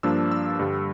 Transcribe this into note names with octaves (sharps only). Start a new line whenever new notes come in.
G2 F3 A#3 D4 E6
E6
G2 D3 G3